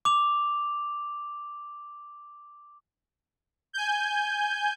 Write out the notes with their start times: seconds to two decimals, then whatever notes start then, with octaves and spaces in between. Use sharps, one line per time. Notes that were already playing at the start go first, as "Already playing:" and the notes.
0.05 D6 F7
3.73 G#5 G6